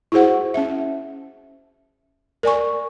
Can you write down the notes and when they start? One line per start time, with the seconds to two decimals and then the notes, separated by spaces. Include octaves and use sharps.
0.12 E4 F#4 G#4 C5 F#5
0.54 C#4 E5
2.43 A#4 D5 G#5 C#6